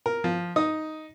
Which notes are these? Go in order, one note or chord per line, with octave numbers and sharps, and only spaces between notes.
A#4
F3
D#4 D#6